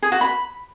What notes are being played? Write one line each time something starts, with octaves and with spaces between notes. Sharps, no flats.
G#4
F#4
B5